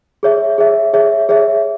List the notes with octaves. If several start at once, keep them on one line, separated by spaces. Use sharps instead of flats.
G#4 C#5 E5
G#4 C#5 E5
G#4 C#5 E5
G#4 C#5 E5